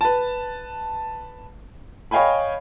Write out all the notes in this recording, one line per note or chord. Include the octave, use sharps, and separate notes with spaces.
B4 A5
C#5 D#5 F5 G5 G#5 B5